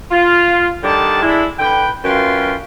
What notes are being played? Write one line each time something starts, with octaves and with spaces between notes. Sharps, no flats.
F4
D3 D#3 G3 D5 A5
G#3 D4 E4
D3 B4 G5
F#2 F4 B4 G5 C6